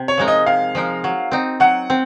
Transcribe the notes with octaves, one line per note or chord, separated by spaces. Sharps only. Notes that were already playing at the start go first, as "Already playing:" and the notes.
Already playing: C3
C#5
F3 G#3 D#4 A#4
D#5
C3 F5
F3 G#3 D#4 A#4
F#3
C4 D#4
F#3 F#5
C4